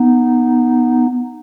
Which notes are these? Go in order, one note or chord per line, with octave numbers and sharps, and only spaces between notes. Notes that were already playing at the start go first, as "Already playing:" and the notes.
Already playing: B3 D#4